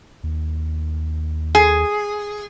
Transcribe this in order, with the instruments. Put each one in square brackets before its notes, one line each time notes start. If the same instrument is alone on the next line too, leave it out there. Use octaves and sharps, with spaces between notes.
[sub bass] D#2
[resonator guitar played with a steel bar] G#4